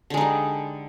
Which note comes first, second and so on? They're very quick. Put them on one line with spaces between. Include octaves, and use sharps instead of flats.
D3 G#3 D#4 G3